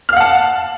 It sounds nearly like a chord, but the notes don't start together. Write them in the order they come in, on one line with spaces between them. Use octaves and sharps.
F6 F5 F#5 A5